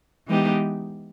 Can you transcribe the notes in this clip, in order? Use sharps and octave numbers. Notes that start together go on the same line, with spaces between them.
E3 G#3 B3 D#4 G4